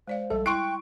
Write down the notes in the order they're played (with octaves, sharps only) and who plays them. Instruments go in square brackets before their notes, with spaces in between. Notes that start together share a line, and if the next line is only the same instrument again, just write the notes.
[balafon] G#3 D5 F5 [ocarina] C5
[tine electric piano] A#1 A4 [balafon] G3 E5
[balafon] E4 [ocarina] G5 [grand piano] C6 C#6 D7 [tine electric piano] F#6